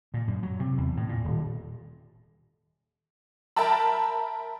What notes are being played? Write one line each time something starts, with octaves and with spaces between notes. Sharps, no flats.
A#2
F#2
F#3
C3
E2
A2
A#2
D#1
A#4 E5 G5 A5 B5